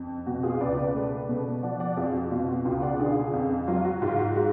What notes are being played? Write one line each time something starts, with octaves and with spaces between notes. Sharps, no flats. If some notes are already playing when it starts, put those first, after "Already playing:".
Already playing: F2
B2 F#4
F4 G#4
C#2 B4 D5
B4 D5
A3
B2
F3 D5 F#5
D5 F#5
F2 F4 G#4
F#4
B2 F4
F#4
C#2 F4 G#4
D5 F#5
D3 F4 G#4
F2
F#3 F4
F#4
G#2 F4
F#4
G#3 F#4